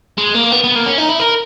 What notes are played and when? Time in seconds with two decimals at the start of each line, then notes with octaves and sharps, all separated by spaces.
0.18 G#3
0.35 A#3
0.52 B3
0.64 B3
0.75 A#3
0.86 C#4
0.98 D#4
1.09 E4
1.20 A#4